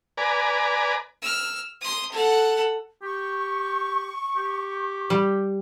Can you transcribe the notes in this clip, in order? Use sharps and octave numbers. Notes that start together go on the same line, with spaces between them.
B4 D5 G#5 A#5
E6 F6
C6 D#6
A4 F#5
G4 C#6
G4
G3